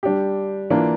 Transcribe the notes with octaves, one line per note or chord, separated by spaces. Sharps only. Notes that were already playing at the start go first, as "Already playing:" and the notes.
G3 D4 G4
E3 A#3 D4 F4